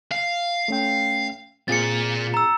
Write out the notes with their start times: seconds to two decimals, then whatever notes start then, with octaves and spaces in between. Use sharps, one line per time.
0.11 F5
0.68 A3 C#4 G5
1.68 A#2 C4 F4 G#4 A6 C#7
2.34 A#5 E6